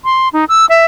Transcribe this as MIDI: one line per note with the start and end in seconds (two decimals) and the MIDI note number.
0.04 0.28 84
0.33 0.45 63
0.49 0.65 88
0.69 0.86 76